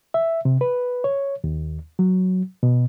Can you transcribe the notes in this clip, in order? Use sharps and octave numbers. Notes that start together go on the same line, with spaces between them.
E5
C3
B4
C#5
D#2
F#3
B2